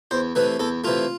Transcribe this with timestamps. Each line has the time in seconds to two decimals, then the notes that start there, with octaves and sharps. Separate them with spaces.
0.11 E2 C5
0.35 C3 E3 A3 B4
0.60 E2 A4
0.84 C3 E3 A3 F4